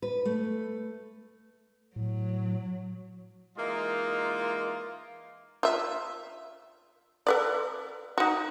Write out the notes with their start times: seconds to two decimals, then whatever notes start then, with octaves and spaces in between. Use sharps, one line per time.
0.02 B4
0.25 A3
1.96 A2 F#3
3.57 E3 G#3 A#3 D#4 F4
5.63 F4 E5
7.27 A4 B4 D5
8.18 D#4 F#4